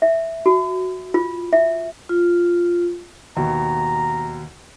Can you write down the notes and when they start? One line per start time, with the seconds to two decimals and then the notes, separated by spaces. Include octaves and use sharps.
0.02 E5
0.46 F#4
1.14 F4
1.53 E5
2.09 F4
3.37 D#2 B2 A#5